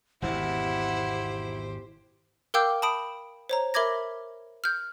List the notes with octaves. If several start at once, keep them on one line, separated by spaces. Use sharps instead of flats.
G#1 E2 B2 E4 G4 C5 F#5
A#4 F5 G5 D6 E6 G6
A5 B5 D#6 D7
C5 C#5 A#5
A#4 E5 B5 D6 G#6 A#6
F6 G6